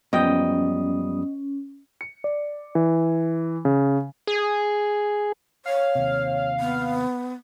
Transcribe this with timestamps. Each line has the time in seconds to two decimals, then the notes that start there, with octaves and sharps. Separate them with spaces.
0.13 F#2 F3 G3 B3 C#4 D#5 G5 D#6
2.01 C#7
2.24 D5
2.75 E3
3.65 C#3
4.27 G#4
5.66 C#5 F5
5.95 D#2 C3
6.60 B3